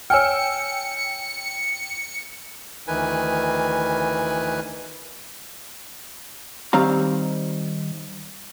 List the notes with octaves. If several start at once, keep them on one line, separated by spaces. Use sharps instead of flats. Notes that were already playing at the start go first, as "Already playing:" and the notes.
C#5 G5 G#5 E6 F6 C#7
D2 D#3 E3 B4 G#5
D#3 G3 C4 F5 A#5